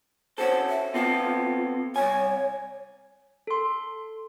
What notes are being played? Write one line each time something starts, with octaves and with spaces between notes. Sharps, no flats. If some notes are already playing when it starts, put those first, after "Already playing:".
C#4 F#4 A4 C5
E5
B3 C4 F4 A4
C2 C#5 G#5
A4 C6